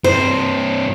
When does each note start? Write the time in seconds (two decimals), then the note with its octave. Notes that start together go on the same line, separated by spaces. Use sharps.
0.04 G2 C4 C5